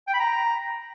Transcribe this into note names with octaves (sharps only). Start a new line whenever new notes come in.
G5
B5
A#5